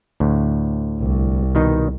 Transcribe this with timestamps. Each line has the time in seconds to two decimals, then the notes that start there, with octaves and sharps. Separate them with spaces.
0.20 D2 A2
1.00 C2
1.55 B2 D#3 D#4